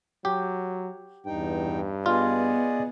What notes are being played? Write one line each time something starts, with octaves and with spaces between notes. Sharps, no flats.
F#3 G4
E2 G2 D#4 G5
B3 F4 G#4 D5 D#5